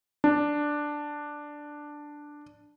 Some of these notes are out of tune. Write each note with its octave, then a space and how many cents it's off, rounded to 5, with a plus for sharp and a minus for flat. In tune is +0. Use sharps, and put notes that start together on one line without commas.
D4 +5